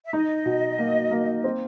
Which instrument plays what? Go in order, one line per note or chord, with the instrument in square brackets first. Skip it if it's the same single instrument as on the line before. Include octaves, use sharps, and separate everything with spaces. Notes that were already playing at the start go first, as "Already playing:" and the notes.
[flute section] E5
[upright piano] D#4 [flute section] D#5
[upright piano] B2
A#3
A#3
C4